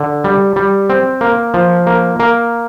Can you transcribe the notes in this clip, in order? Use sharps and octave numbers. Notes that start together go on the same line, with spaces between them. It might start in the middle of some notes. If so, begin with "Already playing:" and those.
Already playing: D3
G3
G3
C4
A#3
F3
A#3
A#3